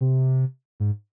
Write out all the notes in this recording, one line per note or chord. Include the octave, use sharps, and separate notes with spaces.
C3
G#2